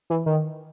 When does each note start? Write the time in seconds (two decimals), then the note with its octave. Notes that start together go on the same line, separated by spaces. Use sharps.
0.10 E3
0.26 D#3